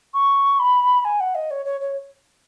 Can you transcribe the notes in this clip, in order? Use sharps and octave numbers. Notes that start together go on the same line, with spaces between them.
C#6
B5
G#5
F#5
D#5
C#5
C#5
C#5